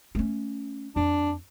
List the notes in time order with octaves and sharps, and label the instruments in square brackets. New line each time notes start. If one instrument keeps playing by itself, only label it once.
[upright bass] A3 C#4
[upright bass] F2 [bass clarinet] D4